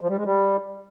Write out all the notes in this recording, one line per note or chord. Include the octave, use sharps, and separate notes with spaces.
F3
G3
G#3
G3